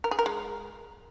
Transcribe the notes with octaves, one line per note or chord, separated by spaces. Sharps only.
A#4
G#4
A#4
G#3